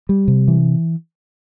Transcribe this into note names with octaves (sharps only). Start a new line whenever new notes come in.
G3
C3
E3